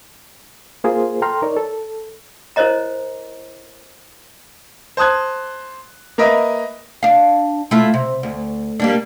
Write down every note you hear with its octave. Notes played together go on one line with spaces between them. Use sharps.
A#3 F4 G#4 A#4 C5
A4 G5 A#5 C6 F6
D#4 A#4 C#5 D5
A4
E4 A#4 C5 C#5 D#5 A#5
C5 A5 D#6 F#6 G#6
A#3 A#4 B4 D#5 E5
D4 F5
A3 E4 F4
C3
D2
G3 A#3 D4